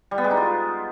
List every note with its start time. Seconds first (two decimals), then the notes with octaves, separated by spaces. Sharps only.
0.11 G3
0.18 B3
0.24 G#3
0.31 D#4
0.37 F4